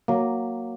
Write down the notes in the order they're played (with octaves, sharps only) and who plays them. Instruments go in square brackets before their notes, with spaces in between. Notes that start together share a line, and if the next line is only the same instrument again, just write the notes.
[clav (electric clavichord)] F#3 A#3